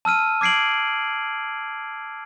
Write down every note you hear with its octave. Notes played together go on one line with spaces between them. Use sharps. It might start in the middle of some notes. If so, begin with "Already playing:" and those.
A5 E6 F6 D#7
D6 G#6 C7 D7 F#7